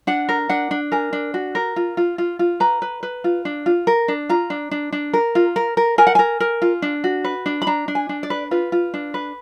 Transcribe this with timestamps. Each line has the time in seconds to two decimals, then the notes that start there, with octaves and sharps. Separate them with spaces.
0.07 D4 F#5
0.29 A#4
0.49 D4 F#5
0.71 D4
0.92 A#4 G#5
1.13 D4
1.34 F#4
1.55 A#4
1.76 F4
1.97 F4
2.18 F4
2.39 F4
2.60 B4 A#5
2.82 B4
3.03 B4
3.24 F4
3.45 D4
3.66 F4
3.87 A#4
4.08 D4
4.29 F4 A#5
4.50 D4
4.71 D4
4.92 D4
5.14 A#4
5.35 F4
5.56 A#4
5.77 A#4
5.98 A#4 G#5
6.07 F#5
6.15 A#4 G#5
6.40 A#4
6.62 F4
6.82 D4
7.04 F#4
7.24 B4
7.46 D4
7.62 B5
7.67 D4 A#5
7.88 D4
7.95 G#5
8.09 D4
8.23 D5
8.30 B4
8.51 F4 B4
8.72 F4
8.94 D4
9.14 B4